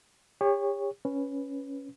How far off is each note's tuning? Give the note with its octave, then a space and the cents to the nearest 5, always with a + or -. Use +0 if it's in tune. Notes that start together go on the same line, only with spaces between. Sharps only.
G4 +40 C#5 +0
C#4 +0 B4 +0